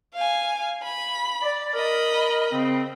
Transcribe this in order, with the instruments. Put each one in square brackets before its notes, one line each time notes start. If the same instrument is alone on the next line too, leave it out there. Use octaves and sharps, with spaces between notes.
[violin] F5 G#5
B5
[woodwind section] D5
[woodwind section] A#4 [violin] D#5 B5
[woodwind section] C#3 C4